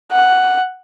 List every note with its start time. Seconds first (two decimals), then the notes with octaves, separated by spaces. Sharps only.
0.11 F#5